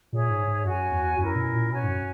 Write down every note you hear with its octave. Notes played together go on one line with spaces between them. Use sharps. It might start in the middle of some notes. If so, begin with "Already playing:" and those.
A#2 G#4 C#5 E5
G#2
G#2
F#2 F#4 C#5 G#5
E2
F#2 C#4 E4 A#4
B2
A#2
B2 C#4 F#4 C#5 G#5
G#2
F#2